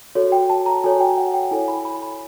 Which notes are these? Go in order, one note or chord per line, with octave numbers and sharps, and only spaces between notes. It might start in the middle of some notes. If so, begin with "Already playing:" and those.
F#4 A4 C#5
G5
A5
A#5
F#4 A4 C#5 G#5
G5
F#5
G5
E4 A4 C#5 G#5
B5
B5
B5